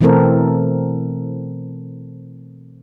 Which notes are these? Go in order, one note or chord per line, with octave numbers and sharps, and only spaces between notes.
B2 E3 A3 C4 A4 A#4